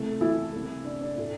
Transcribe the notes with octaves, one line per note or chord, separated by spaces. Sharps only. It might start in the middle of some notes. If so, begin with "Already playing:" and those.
Already playing: C2 C3 A3 A4
E3 E4
C2 C3 A3
D4
D4
A2 A3